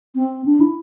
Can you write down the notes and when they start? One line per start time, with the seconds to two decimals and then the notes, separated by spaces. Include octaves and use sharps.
0.15 C4
0.46 D4
0.60 E4